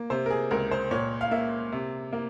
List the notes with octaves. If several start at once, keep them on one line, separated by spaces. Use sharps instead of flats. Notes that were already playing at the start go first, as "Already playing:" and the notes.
Already playing: A#3
C3 C5
A#4
G#4
C#2 A#4
C5
A#2 C#5
F5
A#3 E5
C3
A#3